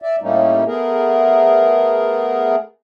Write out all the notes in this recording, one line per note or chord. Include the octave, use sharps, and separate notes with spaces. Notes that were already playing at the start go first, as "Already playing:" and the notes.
D5 E5
A2 G3 A3 A#3 C#4 D#4
A3 B3 G#4 A#4